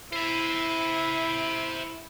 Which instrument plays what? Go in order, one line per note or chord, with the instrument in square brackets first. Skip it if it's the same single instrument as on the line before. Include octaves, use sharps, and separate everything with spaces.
[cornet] E4 [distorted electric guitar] C5 E5